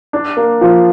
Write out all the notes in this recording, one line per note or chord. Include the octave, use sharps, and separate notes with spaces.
D4
A#3
F3